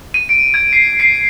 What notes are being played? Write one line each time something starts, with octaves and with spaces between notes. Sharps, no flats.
D#7
D7
G#6
C7
C7